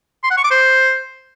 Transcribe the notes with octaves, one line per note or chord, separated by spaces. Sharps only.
C6
F#5
C#6
D6
C5